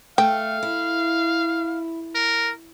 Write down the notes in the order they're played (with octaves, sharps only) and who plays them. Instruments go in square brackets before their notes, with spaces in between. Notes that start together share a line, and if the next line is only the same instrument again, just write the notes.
[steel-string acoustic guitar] A3 [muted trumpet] F5 [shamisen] G5
[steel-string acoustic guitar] E4
[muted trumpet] A#4